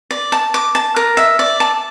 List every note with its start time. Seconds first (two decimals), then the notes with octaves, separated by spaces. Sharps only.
0.11 D5
0.32 A5
0.54 D6
0.75 A5
0.96 A#4
1.17 E5
1.39 D5
1.60 A5